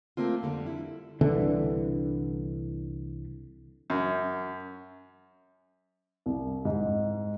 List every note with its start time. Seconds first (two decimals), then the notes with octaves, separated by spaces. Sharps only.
0.17 A3 A#3 C4 F4
0.42 F2 D3 G3
0.67 E4
1.21 C2 D3 E3 D4
3.90 F#2
6.26 C2
6.65 G#2